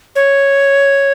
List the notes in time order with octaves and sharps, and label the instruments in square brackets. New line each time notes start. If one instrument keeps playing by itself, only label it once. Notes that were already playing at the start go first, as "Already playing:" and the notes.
[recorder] C#5